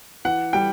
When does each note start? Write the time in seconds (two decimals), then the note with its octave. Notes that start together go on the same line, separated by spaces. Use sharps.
0.25 E3 F#5
0.53 G3 G5